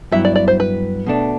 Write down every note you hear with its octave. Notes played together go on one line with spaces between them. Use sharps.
G2 F#3 B3 E4 E5
D5
D5
C5
B4
B2 A3 D4